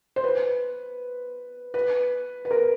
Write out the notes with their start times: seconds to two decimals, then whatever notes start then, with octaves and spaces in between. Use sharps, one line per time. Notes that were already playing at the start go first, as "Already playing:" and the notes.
0.16 C5
0.24 B4
1.74 B4
2.45 B4
2.51 A#4